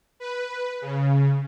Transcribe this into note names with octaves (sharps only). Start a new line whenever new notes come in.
B4
C#3